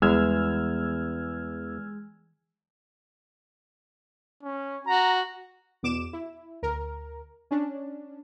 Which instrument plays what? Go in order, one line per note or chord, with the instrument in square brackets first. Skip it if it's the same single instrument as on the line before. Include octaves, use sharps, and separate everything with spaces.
[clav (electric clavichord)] E2 [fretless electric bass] E3 G3 [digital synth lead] G#3 [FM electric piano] E6 F6 G#6
[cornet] C#4
[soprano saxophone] F#4 [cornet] A#5
[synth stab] E2 B2 D6 E7
E4
D2 A#4
C#4 D4